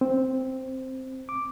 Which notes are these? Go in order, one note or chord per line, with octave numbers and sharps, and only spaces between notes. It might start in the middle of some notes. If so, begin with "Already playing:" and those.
C4
D6